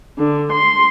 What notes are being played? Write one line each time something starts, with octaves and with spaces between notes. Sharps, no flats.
D3
C6